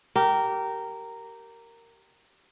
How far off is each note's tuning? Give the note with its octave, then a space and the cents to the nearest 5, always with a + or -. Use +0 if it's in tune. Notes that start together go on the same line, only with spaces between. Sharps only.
G4 -20 A#4 -10